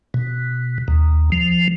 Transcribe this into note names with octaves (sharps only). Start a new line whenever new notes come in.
B2
D#2
F3